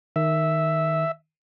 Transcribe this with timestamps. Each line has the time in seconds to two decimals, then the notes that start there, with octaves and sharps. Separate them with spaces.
0.16 D#3 E5